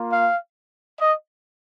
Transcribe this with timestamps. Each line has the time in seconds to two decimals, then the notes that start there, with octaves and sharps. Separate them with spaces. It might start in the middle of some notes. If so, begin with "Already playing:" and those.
Already playing: A#3 F4
0.10 F5
0.99 D#5